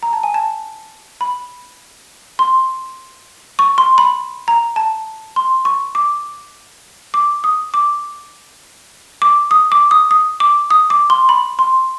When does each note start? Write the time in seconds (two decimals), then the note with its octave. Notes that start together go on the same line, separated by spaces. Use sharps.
0.03 A#5
0.13 A5
0.23 G#5
0.34 A5
1.21 B5
2.39 C6
3.59 C#6
3.78 C6
3.98 B5
4.48 A#5
4.76 A5
5.36 C6
5.65 C#6
5.95 D6
7.14 D6
7.44 D#6
7.74 D6
9.22 D6
9.51 D#6
9.72 D6
9.91 D#6
10.11 D#6
10.40 D6
10.70 D#6
10.90 D6
11.10 C6
11.29 B5
11.59 C6